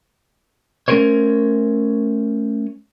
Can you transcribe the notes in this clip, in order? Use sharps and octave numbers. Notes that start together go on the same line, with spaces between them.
A3 C#4 D#4 A#4 C5 C#5